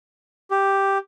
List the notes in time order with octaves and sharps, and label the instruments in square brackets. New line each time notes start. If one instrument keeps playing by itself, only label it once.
[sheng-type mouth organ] G4